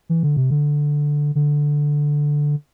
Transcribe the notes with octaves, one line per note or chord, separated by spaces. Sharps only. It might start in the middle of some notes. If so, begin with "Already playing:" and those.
E3
D3
C3
D3
D3